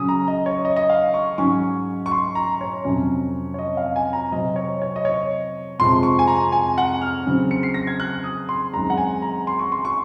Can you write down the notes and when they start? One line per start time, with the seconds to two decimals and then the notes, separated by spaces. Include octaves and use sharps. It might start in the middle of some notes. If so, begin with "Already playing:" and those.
Already playing: C#3 F#3 C#4 D#6
0.09 A#5
0.28 D#5
0.46 C#5
0.65 D#5
0.76 D#5
0.89 F5
1.14 C#6
1.38 G#2 F#3 C#4 C#6
2.06 C#6
2.11 C6
2.35 A#5
2.61 C#5
2.84 F2 C3 F#3 C#4
3.54 C#5
3.59 D#5
3.77 F5
3.96 G#5
4.13 A#5
4.32 C3 F#3 C4 D#5
4.56 C#5
4.82 C#5
4.96 D#5
5.05 C#5
5.79 F2 C3 F3 G#3 C6
6.03 C#6
6.19 G#5
6.27 A#5
6.52 G#5
6.78 F#5
7.02 F6
7.26 C#3 F#3 C4
7.51 C#7
7.63 C7
7.74 A#6
7.87 G#6
8.00 F#6
8.24 D#6
8.49 C6
8.73 F#2 D#3 G#3 C4 A#5
8.90 F#5
8.97 G#5
9.22 A#5
9.47 C6
9.59 C#6
9.72 C6
9.85 C#6